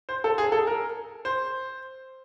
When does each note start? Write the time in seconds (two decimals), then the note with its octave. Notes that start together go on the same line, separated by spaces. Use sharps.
0.09 C5
0.24 A4
0.38 G#4
0.52 A4
0.67 A#4
1.25 C5